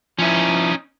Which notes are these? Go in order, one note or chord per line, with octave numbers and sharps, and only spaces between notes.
F3 C#4 D#4 E4